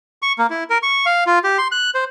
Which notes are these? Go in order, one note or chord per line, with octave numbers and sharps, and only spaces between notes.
C#6
A#3
E4
A#4
C#6
F5
F4
G4
C6
F#6
C5